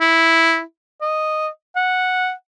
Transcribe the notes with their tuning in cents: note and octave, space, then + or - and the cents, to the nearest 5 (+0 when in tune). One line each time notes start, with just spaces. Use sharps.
E4 -5
D#5 -5
F#5 -10